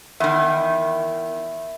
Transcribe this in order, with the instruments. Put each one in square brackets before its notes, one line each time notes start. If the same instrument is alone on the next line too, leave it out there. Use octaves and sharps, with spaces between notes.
[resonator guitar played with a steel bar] E2 D#3 [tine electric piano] E5